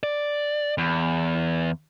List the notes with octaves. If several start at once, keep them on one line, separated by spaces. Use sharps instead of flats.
D5
E2